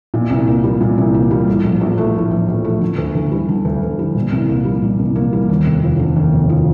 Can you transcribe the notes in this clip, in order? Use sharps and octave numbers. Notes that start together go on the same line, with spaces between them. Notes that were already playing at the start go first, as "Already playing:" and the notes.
A#2
C2
A#3
G3
A#2
C2
A#3
G3
A2
A#1
A#1
A3
A2
A#1
A#1
A3
D3
D2
D2
G3
D3
D2
D2
G3
A#2
C2
A#3
G3
A#2
C2
A#3
G3
D#2
F1
F3
D3
D#2
F1
F3